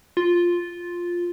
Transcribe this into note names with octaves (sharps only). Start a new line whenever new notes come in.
F4